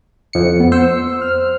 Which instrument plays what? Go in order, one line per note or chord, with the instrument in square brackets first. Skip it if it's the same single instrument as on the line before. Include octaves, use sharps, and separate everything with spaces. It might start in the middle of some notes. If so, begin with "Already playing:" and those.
[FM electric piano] F2 C#7
[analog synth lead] B3
[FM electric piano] C5 [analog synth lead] E6
[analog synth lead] F6